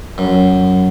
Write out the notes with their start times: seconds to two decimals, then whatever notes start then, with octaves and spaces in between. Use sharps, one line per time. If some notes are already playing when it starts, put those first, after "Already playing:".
0.18 F#2